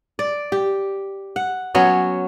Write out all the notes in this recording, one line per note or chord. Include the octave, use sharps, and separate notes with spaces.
D5
G4
F#5
F#3 B3 C#4 C#5